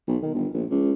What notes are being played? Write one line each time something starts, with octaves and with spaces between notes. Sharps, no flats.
B1
D#3
G1
A#1
C#2